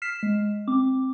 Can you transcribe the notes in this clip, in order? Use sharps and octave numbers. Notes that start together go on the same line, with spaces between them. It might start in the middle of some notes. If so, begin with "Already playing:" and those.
F6 B6 C7 E7
G#3
C4 D6